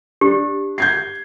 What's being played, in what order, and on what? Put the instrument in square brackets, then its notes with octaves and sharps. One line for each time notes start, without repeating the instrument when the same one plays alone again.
[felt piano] D4 [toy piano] G4
[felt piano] G6 G#6 C7